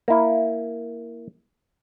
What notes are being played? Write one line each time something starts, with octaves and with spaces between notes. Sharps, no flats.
A#3 E4